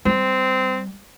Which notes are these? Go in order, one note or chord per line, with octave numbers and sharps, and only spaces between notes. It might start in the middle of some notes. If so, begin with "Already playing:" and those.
G3 C4